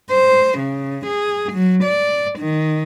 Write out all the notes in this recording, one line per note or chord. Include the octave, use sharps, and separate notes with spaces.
C5
C#3
G#4
F#3
D5
D#3